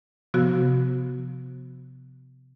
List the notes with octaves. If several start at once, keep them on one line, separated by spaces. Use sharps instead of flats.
C3 F3 B3 F#4